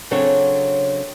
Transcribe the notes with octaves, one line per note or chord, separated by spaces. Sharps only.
C#3 F#3 C4 D4 A4 C#5